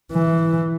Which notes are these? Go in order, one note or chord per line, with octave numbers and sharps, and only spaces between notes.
E3